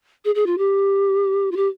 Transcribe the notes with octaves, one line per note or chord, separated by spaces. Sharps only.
G#4
G#4
F4
G4
F4
G4